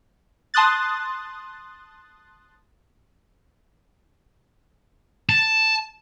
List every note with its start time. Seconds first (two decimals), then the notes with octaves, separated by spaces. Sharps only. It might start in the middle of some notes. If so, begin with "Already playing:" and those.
0.54 A5 C6 D#6 F#6 A6
5.29 A5